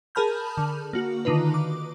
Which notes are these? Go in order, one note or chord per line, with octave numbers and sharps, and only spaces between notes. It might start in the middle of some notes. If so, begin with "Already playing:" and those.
G#4 A#4 A5 B5 F6 G6
D3
A#3 F#4
D3 D#3 D#4 F4 B4
D6